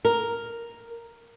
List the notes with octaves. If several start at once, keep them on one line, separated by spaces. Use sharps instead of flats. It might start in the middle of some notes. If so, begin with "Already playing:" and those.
A#4